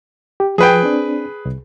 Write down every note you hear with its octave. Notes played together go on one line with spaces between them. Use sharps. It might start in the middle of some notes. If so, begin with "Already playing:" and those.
G4
F3 G#4 B4 G5
C4 D4
C2